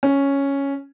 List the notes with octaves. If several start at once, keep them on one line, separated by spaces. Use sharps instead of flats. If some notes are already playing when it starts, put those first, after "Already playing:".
C#4